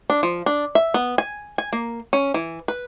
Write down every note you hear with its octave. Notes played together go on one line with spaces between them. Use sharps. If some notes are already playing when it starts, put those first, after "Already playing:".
D4
F3
D4
E5
B3
G#5
G#5
A#3
C#4
E3
B4